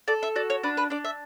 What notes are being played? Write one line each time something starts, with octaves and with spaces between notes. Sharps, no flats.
A4 D5
E5
F#4 D5
C#5
D4 B4
B4
D4 D5
E5